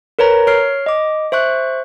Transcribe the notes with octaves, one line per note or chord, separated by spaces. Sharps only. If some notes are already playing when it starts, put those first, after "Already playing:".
A#4 B4 C#5 A#5
C#5 F6 C7
D#5 D6
C5 E5 C#6 F#6